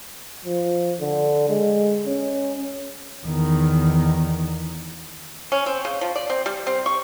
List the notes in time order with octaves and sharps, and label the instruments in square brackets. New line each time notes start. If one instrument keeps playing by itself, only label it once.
[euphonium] F3
D3
G#3
C#4
[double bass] E2 D#3
[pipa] C#4
C4
C#3
F3
D5
C4
G3
C4
C#6